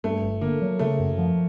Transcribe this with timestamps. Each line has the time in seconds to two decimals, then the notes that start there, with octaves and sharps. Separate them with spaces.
0.04 G2 A3
0.22 G1
0.41 D3 A#3
0.62 F#3
0.79 C#3 A3
0.99 F#2
1.18 F3